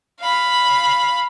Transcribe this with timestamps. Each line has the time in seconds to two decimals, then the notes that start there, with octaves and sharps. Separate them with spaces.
0.20 F5 B5